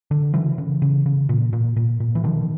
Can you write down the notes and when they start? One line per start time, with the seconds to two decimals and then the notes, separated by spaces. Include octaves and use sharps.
0.11 D3
0.34 C#3 E3 F#3
0.58 C#3
0.82 C#3
1.06 C#3
1.29 A#2
1.53 A#2
1.76 A#2
2.00 A#2
2.15 E3
2.24 B2 D#3 F3